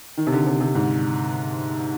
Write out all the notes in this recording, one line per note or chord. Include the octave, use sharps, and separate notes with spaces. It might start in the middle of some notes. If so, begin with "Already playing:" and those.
D#3
C3
D3
C3
C3
G#2